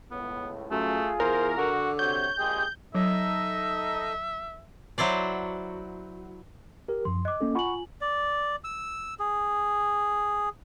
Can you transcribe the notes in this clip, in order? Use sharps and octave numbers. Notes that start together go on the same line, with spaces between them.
C#2 A2 B3
F#2 A3 F4 G#4
E2 A#4 C5
D3 F#4
C3 F#4 C#5 G6
A#1 G#3 G4 G#4
F#3 D#4 A4 D#5 E5
F#3 E4 C5 D5
G4 A#4
F#2 F3 C6
D#5 D6 F#6
A#3 C#4 A4
F4 F#5 G#5 B5 C#6 F#7
D5
E6
G#4